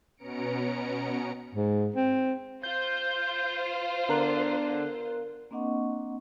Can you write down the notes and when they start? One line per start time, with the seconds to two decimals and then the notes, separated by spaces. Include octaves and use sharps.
0.17 B2 B3 C#4 A#5 C#7 D7
1.55 G#2
1.96 C4
2.63 F4 C5 G6
4.09 D3 B3 A#4 F#6
5.51 A#3 C4 D4 D#5 F#5 C#6